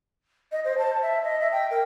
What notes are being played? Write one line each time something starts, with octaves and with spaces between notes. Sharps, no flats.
D#5
C5
A5
E5
D#5
E5
G5
A#4